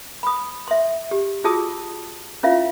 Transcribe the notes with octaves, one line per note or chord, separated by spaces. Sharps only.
B5 D#6
E5 C6
G4
F4 F#4 G#4 A5 D#6 E6
C#4 E4 F4 E5 F5